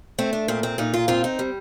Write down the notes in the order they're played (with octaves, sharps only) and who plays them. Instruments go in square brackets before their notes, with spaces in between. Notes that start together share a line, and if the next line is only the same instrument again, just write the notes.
[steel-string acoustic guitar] A3 C4
D4
A#2 C4
C4
A#2 D#4
F4
C4 F4
D#4
G3